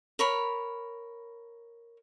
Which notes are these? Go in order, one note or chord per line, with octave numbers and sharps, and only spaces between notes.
A#4 C#5 B5